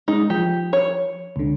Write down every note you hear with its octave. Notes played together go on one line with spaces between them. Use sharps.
G#3 D#4
F3 G4
C#5
C#2 D3